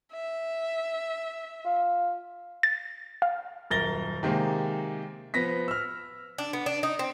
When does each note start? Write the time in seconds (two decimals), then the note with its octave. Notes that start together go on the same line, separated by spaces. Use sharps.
0.12 E5
1.65 F4
2.63 A6
3.22 F5
3.70 D#1 F#2 A#4 A6 A#6 G7
4.23 C3 D#3 G#3 A#3
5.34 F3 B3 A#6 B6
5.68 E6 F6
6.38 D4
6.53 B3
6.66 D4
6.83 D#4
6.99 C4